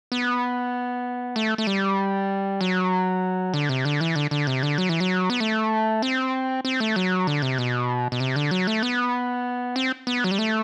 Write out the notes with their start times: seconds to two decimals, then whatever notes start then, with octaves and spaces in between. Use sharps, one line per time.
0.12 B3
1.36 A3
1.58 A3
1.67 G3
2.61 F#3
3.54 D3
3.69 C3
3.85 D3
4.01 E3
4.16 D3
4.31 D3
4.47 C3
4.63 D3
4.78 F#3
4.89 E3
5.00 F#3
5.30 B3
5.40 A3
6.02 C4
6.65 C4
6.80 A3
6.96 F#3
7.27 D3
7.42 C3
7.58 B2
8.12 B2
8.20 C3
8.36 D3
8.51 F#3
8.67 A3
8.83 B3
9.76 C4
10.07 B3
10.24 F#3
10.31 G3
10.38 A3